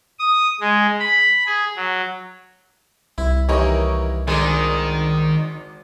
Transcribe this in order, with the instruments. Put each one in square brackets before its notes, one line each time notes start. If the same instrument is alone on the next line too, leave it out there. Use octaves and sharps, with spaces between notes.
[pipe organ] D#6
G#3
B5
G#4
F#3
[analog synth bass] C2 [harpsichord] E4
[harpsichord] D#2 E3 [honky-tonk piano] D#4 A#4 C#5
[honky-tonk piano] G#1 [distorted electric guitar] D#3 [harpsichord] G#3 D4 G#4